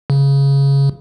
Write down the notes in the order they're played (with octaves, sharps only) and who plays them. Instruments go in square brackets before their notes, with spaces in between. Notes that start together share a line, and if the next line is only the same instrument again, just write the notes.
[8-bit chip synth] C#3